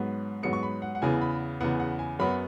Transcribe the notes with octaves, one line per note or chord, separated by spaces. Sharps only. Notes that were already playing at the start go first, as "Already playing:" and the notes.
Already playing: G#2 F#3 B3
G#2 F#3 B3 C#7
C#6
B5
F#5
F#5
E2 C#3 E3 B3 G#5
B5
E2 C#3 E3 B3 F#5
F#5
G#5
F#2 F#3 B3 B5